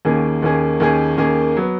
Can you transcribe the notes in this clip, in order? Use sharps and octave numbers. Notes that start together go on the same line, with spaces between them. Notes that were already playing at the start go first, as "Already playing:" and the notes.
D#2 D#3 A#3 C#4 G#4
D#2 D#3 A#3 C#4 G#4
D#2 D#3 A#3 C#4 G#4
D#2 D#3 A#3 C#4 G#4
F#3 B3